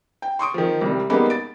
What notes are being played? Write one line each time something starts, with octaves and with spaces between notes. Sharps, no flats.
G5
C6 C#6 D#6 D7
D#3 F3
C2 G3
G3 G#3 A#3 B3 D#4
A6 D7